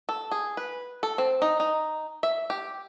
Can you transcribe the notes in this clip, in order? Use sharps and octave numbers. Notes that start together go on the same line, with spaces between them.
A4
G#4
B4
A4
C4
D#4
D#4
E5
G4